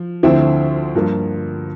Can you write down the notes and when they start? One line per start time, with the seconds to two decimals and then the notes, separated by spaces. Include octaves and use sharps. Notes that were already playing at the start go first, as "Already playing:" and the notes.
Already playing: F3
0.23 D2 D3 F3 C4 E4
0.95 G2 F3 A#3